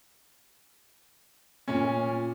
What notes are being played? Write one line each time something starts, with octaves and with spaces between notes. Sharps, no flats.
A#2 C#4